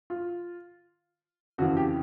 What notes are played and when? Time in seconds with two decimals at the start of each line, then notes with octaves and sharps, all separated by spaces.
0.10 F4
1.58 F2 C#3 E3 F#4
1.77 G4